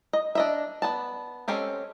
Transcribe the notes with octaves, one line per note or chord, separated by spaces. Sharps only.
D#5
D4 D#5 E5
B3 D5 A5
G#3 C4 C#4 G4 A4